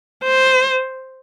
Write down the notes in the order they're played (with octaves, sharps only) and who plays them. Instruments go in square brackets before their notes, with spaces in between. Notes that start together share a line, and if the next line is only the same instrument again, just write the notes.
[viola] C5